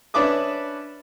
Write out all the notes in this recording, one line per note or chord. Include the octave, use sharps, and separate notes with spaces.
C#4 D4 B4 E5 D6 D#6